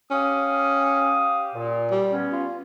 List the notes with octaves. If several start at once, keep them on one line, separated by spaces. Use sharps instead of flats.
C#4 G4 F5 D#6
A#2
G3
B3 C#4
F4